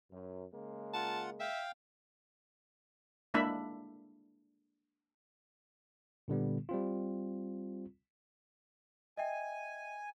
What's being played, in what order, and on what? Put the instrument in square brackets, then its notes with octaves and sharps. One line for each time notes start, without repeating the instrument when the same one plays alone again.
[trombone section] F#2
C#3 G#3 A#3
[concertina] F4 F#5 [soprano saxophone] A5
[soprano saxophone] E5 [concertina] F5 G5
[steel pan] G#3 A#3 D4 E4 E5 B5
[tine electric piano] A#2 D3 G3 B3
G3 C4 F4
[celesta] D#5 E5 G5 [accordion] G#5